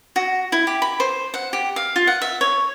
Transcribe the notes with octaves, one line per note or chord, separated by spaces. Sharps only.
F#4
E4
G4
B5
C5
F#5
G4
F5
F4
F#5
E5
C#5